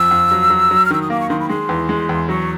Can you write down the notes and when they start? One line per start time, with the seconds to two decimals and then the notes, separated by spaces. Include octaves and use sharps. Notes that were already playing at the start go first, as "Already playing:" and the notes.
Already playing: F2 E6
0.11 F2
0.31 F#3
0.50 F#3
0.71 F#3
0.86 F6
0.91 D#3 E6
1.02 D#6
1.10 A#3 D6
1.20 C#6
1.30 D#3 C6
1.40 B5
1.49 G#3 C6
1.69 E2
1.89 G#3
2.09 E2
2.29 F#3 C#6